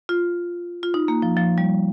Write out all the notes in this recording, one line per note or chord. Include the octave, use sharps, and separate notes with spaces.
F4
F4
D#4
A#3
F3
F3
G3